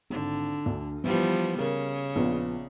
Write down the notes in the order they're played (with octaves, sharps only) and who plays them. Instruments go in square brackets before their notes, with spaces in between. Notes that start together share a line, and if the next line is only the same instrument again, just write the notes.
[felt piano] G#1 [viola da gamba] D3
[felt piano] D2
[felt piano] E3 [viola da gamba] F3 G3 B3
[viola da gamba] C#3 [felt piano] A#4
[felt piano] A#1 B3 F4